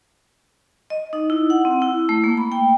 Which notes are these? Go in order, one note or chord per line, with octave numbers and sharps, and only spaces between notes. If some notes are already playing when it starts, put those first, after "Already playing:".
D#5
D#4
E4
F#5
C4
E4
A3
A#3
B5
G5